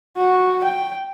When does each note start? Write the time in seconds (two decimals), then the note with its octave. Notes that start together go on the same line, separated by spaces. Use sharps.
0.17 F#4
0.64 G5